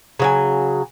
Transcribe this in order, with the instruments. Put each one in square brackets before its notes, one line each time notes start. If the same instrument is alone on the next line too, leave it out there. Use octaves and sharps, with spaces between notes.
[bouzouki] C#3 F#3 G#5